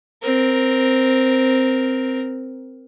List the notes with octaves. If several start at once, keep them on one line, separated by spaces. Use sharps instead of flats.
C4 A#4